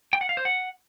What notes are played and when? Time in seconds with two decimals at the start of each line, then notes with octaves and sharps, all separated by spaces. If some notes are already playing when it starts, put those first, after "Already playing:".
0.13 G5
0.21 F#5
0.29 F5
0.37 C5
0.45 F#5